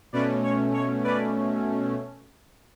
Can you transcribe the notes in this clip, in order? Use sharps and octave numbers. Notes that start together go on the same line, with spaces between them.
B2 A3 C#4 B4 D5
C#5
C#5
B4 D5